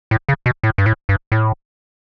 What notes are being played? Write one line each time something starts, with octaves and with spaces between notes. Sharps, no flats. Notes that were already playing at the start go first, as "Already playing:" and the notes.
A2
C#3
B2
A2
G2
A2
G2
A2